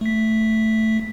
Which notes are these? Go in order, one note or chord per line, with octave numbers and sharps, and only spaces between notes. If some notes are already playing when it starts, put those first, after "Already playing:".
A3 B6